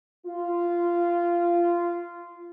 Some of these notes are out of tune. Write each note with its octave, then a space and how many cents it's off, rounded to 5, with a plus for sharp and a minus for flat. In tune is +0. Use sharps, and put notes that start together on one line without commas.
F4 -15